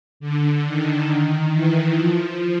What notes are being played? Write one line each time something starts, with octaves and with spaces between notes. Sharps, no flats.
D3
D#3
E3
F3